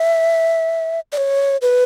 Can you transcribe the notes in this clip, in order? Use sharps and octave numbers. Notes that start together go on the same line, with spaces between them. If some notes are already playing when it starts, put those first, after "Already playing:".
Already playing: E5
D5
C#5
B4